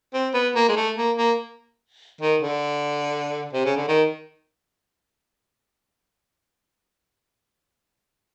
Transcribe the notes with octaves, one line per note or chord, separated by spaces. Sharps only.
C4
B3
A#3
G#3
A3
A#3
A#3
D#3
D3
C3
C#3
D3
D#3